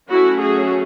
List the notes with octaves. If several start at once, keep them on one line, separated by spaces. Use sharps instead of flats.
F#3 A3 C#4 E4 F#4
F#4 G#4